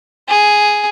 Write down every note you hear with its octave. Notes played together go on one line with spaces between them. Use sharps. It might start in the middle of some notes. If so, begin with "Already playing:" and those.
G#4